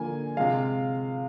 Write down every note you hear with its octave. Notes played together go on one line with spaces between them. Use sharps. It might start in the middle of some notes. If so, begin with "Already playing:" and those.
Already playing: D3 F3 A#3 G#5
C3 F3 G#3 F5